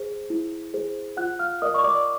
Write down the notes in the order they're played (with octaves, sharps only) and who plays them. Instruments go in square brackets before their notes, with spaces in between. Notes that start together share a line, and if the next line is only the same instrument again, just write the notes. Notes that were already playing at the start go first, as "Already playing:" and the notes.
Already playing: [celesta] G#4 C5
E4
G#4 C5
F4 F#5 F#6
F5 F6
A#4 D5 D#5 D#6
C#6
D5 D6